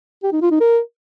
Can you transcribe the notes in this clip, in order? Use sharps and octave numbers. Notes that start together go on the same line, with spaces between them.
G4
D#4
F4
D#4
A#4